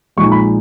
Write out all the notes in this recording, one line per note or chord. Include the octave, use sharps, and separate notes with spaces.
A#1 A#2 G#3 D#4 C#6
B5